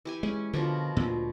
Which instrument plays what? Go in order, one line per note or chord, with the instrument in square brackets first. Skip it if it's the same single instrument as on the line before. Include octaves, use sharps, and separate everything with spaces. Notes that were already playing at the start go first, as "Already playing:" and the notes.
[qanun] E3 G4 G#5
[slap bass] G#3 [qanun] C#4
[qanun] B2 F3 A#3 [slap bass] D3
[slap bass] D2 A#2